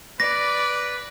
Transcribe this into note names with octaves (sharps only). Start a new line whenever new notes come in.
B4 D5 A#6